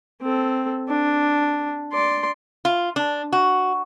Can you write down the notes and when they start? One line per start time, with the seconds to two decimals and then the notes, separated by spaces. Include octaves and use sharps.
0.22 C4 A4
0.89 D4
1.93 D5 C6
2.65 F4
2.96 D4
3.33 F#4